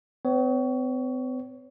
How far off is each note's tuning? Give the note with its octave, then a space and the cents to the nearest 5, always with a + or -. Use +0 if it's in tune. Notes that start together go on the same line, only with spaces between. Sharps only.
C4 -45 C#5 +20